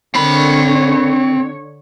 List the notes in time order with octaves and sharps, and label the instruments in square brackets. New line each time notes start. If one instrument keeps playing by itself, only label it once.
[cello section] D3 C#5 [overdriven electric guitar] C4 B5